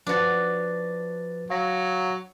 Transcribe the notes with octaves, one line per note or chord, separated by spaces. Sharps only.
F3 D4 F#4 B4 A6
F#3 F5 A#6